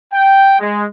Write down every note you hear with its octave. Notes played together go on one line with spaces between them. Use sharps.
G5
G#3